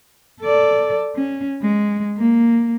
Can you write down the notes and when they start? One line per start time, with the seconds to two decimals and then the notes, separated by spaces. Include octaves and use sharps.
0.41 A4 D5
1.15 C#4
1.62 G#3
2.17 A#3